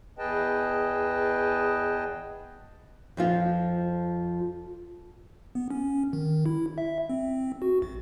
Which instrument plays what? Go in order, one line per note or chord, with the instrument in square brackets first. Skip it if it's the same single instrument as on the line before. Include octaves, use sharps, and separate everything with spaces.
[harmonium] E2 G#4 B4 D#5 G5 A5
[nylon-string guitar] F2 F3 F4
[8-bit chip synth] B3
C#4
D#3
E4
E5
C4
F#4
A1